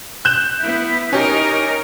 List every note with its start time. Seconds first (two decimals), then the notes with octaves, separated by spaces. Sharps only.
0.25 F#6 G6 E7
0.59 B3 E4
1.13 C#4 D#4 G4 A#4